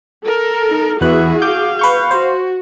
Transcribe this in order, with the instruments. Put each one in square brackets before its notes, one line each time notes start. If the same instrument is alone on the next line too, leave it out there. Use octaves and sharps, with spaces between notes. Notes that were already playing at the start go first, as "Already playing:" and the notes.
[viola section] A4 A#4
[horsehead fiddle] D#4
[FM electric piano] E2 B4 F#6 [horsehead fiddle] E4 E5 [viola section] F#4 G#4
[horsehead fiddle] F5 [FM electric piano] D6 G6
[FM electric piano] B4 C#6 G6
[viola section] F#4 [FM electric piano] C5